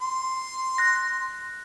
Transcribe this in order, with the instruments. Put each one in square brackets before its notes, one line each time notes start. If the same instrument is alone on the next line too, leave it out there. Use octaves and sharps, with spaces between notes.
[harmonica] C6
[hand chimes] F#6 A#6